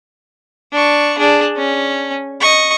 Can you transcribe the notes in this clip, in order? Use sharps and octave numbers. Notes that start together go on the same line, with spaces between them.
D4 C#6
D4 G#4
C#4
D#5 C#6